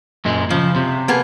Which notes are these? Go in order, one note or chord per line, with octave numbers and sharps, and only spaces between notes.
F#2 A#2 G#3
C#3 F3
C3
A#3 B3 G#4